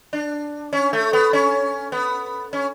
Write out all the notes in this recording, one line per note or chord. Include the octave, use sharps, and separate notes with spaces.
D4
C#4
A3
B3
C#4
B3
C#4